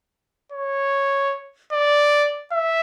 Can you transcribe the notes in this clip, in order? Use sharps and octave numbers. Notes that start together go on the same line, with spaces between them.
C#5
D5
E5